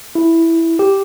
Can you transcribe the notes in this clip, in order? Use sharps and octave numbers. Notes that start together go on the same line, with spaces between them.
E4
G4